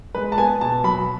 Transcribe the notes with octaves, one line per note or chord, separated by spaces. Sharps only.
G#3 B4
A5
B3 G#5
B2 A5
F#3 B5